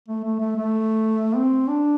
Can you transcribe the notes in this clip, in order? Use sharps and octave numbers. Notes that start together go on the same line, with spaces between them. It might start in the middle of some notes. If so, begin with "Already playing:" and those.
A3
A3
A3
A3
C4
D4